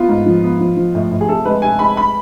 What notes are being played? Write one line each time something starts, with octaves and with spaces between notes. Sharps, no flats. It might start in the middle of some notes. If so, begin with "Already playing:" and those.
Already playing: B3 F4
G#2
F3
B3
F3
F3
A2
A2
G#4
C3 A4
G#3 B4
C3 G#5
G#3 B5
B5